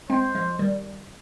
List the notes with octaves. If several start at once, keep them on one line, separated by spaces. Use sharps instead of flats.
G#3 C4 C5
F3 G#3
D#3 G3